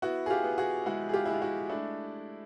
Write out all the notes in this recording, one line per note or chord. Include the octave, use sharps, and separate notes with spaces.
B3 E4 F#4
G#4
F4 G4
B3
F#4 G#4
G#3 E4 F#4
G#4
F4 G4
G#3 E4
F4
E4 F#4
A3 D4 E4